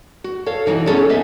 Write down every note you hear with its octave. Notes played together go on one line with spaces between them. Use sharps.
F#4
A4 C#5 F5
B2 E3 D#4 F#4
B3 C#4 G#4 A4 C#5
C#3 B3 D#5 E5